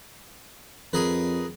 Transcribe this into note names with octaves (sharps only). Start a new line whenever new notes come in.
F2 G#4 A#4 B4